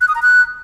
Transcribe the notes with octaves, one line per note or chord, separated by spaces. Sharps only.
F#6
D#6
A#5
F#6